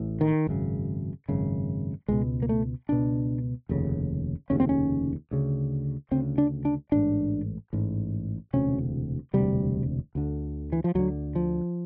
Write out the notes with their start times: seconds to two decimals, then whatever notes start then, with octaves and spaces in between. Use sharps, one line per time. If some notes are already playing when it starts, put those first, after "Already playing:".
Already playing: A1 A2
0.21 D#3
0.47 G#1 F#2 C#3
1.29 G#1 F#2 C#3
2.08 C#2 B2 G#3
2.42 A#3
2.49 A3
2.89 C#2 B2 D4
3.69 F1 D#2 C#3
4.50 F1 D#2 C#3 C#4
4.60 C4
4.69 C#4
5.31 D2 C#3
6.11 D2 C#3 C4
6.38 D4
6.65 D4
6.92 A1 G#2 D4
7.73 A1 G#2
8.53 E1 D2 C3 C#4
9.33 E1 D2 C3 G3
10.15 D2 D3
10.72 E3
10.84 F3
10.95 D2 D3 F#3
11.35 F3